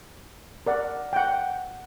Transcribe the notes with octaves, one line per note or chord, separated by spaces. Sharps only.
A#4 D5 F#5
F#5 G5